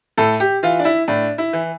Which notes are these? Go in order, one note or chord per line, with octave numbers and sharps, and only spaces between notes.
A2 A4
G4
E3 F4
D4
E4
A2 D4
E4
E3